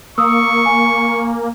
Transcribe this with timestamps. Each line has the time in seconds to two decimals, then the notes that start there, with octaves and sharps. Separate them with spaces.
0.18 A#3 C#6 D#6 E6
0.66 G#5